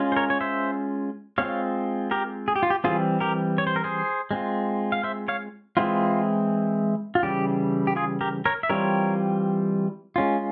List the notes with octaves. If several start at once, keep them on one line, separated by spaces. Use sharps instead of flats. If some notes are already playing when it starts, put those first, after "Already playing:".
Already playing: G#3 C#4 F4
C5
A#4 C#5
C#5
C5 E5
G#3 C4 F4 C#5 F5
G4 A#4
G#4
G4
F4
G4
E3 G3 C4 F4 G#4
G4 A#4
C#5
C5
A#4
G#4 C5
G#3 C4 F4
F5
C5 E5
C#5 F5
E3 G#3 C4 E4 F4
F4
C#3 E3 G3 G4
G4
F4 G#4
G4 A#4
A#4 C#5
E5
E3 G3 C4 F4 A#4 C#5
G#3 C#4 F4